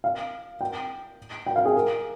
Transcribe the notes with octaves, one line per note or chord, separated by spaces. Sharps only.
F5
G5
G5
F5
G#4
A#4